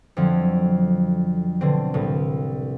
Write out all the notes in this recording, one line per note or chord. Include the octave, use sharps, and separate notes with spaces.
F2 D3 F3 F#3 C4
B2 D3 C4
C2 A2